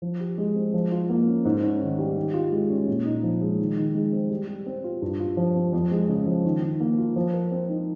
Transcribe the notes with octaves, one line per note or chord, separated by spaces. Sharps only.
F3
G4
G#3
C4
F3
F4
A#3
C#4
G#2
C#4
D#3
G3
D#3
F4
G#3
C#4
A#2
D#4
F3
G#3
D#3
D#3
G#3
C4
G3
G3
C4
F4
G2
F4
F3
C4
F2
G#3
C#3
F3
D#3
D#3
A#3
F4
F3
A#4
C4
D#4